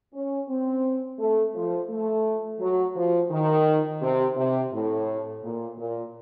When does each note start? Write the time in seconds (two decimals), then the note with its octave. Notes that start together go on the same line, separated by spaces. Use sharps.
0.14 C#4
0.49 C4
1.19 A3
1.55 F3
1.90 A3
2.60 F#3
2.96 F3
3.31 D#3
4.02 C3
4.37 C3
4.72 A2
5.43 A#2
5.78 A#2